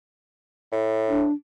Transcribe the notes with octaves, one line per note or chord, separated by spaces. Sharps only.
A2
D4